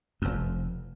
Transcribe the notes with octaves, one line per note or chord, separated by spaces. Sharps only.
F1 F2